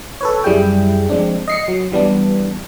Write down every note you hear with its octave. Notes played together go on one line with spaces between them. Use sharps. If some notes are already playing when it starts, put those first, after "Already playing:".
A4 B4 C#5
F#2 G3 E4 G#4 G5
F3 G#3 C4 D4
D#5 C7 C#7
F#3
E3 G3 B3 D4